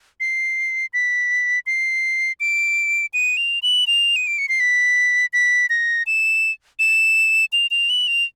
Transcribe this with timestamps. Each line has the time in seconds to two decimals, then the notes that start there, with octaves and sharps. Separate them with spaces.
0.20 C7
0.93 B6
1.66 C7
2.40 D7
3.14 D#7
3.37 F7
3.63 F#7
3.87 F7
4.16 D#7
4.27 D7
4.38 C#7
4.49 C7
4.60 B6
5.33 B6
5.70 A#6
6.07 E7
6.79 E7
7.53 F7
7.71 F7
7.90 F#7
8.07 F7